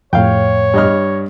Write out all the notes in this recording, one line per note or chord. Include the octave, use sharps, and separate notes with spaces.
F2 A2 C#5 F5 G5
G2 D#5 F6